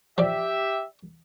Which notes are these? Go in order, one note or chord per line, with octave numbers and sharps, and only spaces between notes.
F3 G4 D5 E5